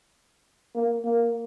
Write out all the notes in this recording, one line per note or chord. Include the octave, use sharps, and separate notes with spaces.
A#3
A#3